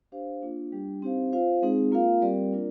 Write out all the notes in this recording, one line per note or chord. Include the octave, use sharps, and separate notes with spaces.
D4 G4 C5 F5
A#3 D4 F4
G3 D4 G4
C4 D#4 G4 C5 F5
F4 C5 F5
G#3 C4 D#4 G#4
A#3 F4 A#4 F5
G3 C4 G4 A#4 D5
A#3 D4 F4 A#4 D5